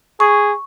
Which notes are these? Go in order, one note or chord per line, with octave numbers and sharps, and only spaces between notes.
G#4 C#6